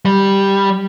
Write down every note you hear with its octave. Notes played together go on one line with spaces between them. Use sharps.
G3